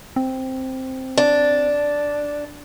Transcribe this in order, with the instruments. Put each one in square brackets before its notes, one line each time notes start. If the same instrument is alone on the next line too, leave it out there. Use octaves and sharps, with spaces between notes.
[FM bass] C4
[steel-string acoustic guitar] D4